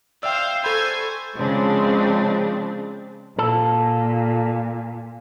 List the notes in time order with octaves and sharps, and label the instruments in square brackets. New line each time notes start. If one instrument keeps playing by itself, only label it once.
[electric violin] C5 F5 [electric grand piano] D5 E5 G5 [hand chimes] E6
[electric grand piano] A4 B5 [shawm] C5 [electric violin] G#5 C#6
[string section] C#3 F3 G#3 C4 D4
[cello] A#2 [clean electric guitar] A4